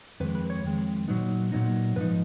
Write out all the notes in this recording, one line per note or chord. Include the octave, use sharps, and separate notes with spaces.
F2 D#3 G#3 B4
B4
C#5
F2 D#3 G#3
A#2 F#3 B3 D#4
A#2 F#3 B3 D#4
G#2 F3 D#4 B4